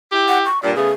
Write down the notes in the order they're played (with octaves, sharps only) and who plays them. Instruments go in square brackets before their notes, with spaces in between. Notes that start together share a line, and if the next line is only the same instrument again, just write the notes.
[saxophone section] E4 G4
[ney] F#5
C#6
[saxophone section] G2 A#2 [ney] D5
[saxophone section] C#3 A3 B3 [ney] G#4